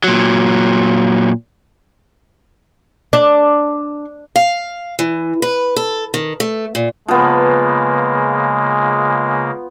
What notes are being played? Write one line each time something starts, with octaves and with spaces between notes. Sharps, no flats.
A#2 F#3
D4
F5
E3
B4
A4
D#3
A3
A#2
C#3 F3 G#3 A#3 B3 B4